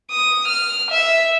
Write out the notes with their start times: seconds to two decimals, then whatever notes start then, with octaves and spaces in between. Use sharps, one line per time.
0.12 D#6
0.48 F6
0.91 E5